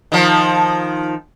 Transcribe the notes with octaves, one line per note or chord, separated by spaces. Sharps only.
D#3 F3